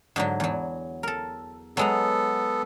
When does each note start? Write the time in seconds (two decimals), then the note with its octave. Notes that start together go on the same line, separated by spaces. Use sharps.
0.16 G#2 D3 F#3
0.40 E2 F#3
1.03 A4 A#4
1.77 F#3 G#3 B3 A4 A#5